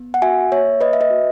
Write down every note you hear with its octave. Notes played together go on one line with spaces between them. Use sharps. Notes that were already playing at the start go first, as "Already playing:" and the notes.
Already playing: B3
F#5
F#4 E5 G#5
A#3 C#5 E5
A#3 B4 D#5
E5
B4 D#5
F#4